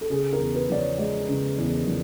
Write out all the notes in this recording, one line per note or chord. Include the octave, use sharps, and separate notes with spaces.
A4
C#3 G#4
A#4
E2
B4
F3 D5
C#5
G#3 D5
C#3
E2
F3